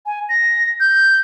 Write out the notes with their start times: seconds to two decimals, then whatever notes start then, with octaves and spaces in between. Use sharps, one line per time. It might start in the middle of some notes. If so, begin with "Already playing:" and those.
0.06 G#5
0.29 A#6
0.80 G6